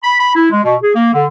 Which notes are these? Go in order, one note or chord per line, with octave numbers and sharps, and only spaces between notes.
B5
B5
E4
G#3
B2
G#4
A#3
D3